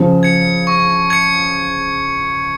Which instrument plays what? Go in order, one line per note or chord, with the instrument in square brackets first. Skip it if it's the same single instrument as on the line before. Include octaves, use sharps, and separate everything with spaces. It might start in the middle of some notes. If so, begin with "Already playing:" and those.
Already playing: [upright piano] C#3 F3
[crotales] G#6 C#7
C#6
G#6 C#7